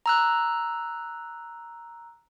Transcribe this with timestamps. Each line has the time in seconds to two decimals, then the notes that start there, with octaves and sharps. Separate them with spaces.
0.06 A#5 E6 F#6